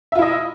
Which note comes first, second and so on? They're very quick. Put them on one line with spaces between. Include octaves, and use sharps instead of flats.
E5 F4 E4 D#5